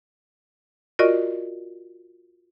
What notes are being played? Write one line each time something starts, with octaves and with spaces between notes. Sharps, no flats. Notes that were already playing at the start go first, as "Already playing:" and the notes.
F4 F#4 A#4 D5 D#5 C#6